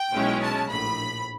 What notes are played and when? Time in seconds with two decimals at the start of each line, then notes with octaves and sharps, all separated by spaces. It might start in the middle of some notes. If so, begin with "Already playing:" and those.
Already playing: G5
0.12 B1 B2 G#3 C#4 E4
0.41 A5
0.70 A#1 A2 B5